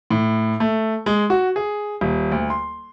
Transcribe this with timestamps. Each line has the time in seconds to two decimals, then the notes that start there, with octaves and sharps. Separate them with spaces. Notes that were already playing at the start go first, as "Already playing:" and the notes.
0.11 A2
0.60 A3
1.06 G#3
1.30 F#4
1.56 G#4
2.01 D#1
2.32 D2
2.50 C6